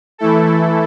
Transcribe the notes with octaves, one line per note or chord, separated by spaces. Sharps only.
E3 A3 E4 A4